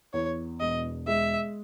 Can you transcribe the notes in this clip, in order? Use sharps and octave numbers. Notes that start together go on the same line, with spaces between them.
E2 C#5
E1 D#5
G#3 E5